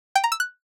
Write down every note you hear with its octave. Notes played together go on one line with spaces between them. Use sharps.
G5
A#5
E6
F#6